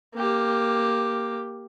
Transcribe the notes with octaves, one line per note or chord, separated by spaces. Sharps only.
A#3 G4